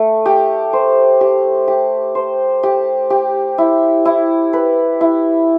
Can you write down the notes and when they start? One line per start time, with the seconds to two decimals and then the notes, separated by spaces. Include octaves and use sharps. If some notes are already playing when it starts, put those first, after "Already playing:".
Already playing: A3
0.26 G4
0.73 C5
1.21 G4
1.68 G4
2.15 C5
2.63 G4
3.10 G4
3.58 E4
4.05 E4
4.53 B4
5.01 E4